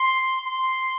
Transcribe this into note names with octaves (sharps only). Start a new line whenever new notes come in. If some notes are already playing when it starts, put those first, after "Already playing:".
Already playing: C6
C6